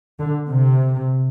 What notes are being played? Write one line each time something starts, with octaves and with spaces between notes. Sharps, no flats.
D3
C3